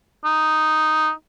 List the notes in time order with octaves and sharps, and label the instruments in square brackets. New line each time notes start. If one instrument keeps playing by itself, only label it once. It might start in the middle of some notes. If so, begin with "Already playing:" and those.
[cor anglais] D#4